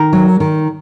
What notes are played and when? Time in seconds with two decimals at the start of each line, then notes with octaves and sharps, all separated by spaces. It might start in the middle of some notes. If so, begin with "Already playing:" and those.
Already playing: D#3 A#4
0.13 F#3
0.40 D#3